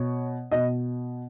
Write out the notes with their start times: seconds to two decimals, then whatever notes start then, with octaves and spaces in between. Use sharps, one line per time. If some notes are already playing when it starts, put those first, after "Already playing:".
Already playing: B2 C#5
0.51 B2 D#5